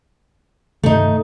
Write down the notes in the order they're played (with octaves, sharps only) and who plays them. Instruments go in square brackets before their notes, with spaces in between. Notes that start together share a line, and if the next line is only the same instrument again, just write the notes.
[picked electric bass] G2 C3 D#3 [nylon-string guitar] A3 D#4